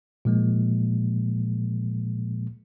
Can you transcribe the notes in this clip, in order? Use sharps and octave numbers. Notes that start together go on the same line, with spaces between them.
A#2 F3 G#3 A#3